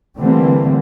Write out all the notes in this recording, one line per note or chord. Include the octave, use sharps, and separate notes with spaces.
D3 E3 G3 A3 A#3 C4